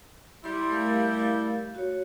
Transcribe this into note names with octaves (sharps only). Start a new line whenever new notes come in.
G3 E4 C6
A3 A#4 F5
F#4 C#5